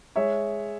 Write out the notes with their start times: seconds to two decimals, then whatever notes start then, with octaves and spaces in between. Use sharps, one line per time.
0.16 G#3 C#5 E5